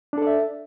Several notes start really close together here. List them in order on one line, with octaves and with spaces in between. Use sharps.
D4 A4 D5 E5